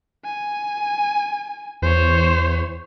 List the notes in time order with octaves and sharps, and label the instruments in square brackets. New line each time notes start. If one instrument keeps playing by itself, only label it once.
[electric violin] G#5
[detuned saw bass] E2 [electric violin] C5 C#5